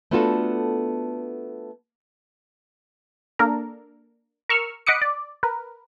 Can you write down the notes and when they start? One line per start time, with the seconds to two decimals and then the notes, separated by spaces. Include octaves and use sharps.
0.11 A3 B3 D4 F4 F#4 A4
3.39 A#3 D4 A4 A#4
4.49 A#4 C#6 E6 F6
4.86 D#5 F#5 B5 D6 D#6 C#7
5.02 D5
5.43 A#4 B4